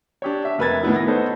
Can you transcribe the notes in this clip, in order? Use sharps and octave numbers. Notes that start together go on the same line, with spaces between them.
D4 G4 C#5
E5
F1 A#4 B4 E5 G#6 A6
A2 D#3 B3 E4
A#6
B3 D#4 A4 C5 C#5